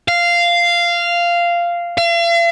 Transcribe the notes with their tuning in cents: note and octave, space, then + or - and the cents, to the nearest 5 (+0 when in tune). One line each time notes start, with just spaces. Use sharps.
F5 -10
F5 -45